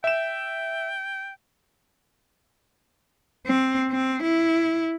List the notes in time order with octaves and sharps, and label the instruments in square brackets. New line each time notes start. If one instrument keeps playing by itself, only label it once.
[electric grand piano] E5 E7 [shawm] G5
[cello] C4
C4
E4